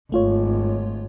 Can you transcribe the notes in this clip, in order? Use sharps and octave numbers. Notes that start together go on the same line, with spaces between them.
G#1 A3 F4 C#5